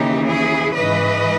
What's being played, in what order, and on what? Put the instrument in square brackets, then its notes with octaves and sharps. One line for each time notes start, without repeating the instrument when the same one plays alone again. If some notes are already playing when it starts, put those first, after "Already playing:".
Already playing: [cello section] D#2 C#3 E3 D#4 G4
E4 G#4
G#2 E3 B4 D#5